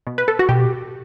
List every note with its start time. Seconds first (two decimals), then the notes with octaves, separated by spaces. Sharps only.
0.07 B2
0.18 B4
0.28 A4
0.39 F#4
0.49 B2 G4